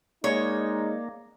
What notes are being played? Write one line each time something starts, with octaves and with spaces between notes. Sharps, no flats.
G#3 A#3 D#4 C#5 D5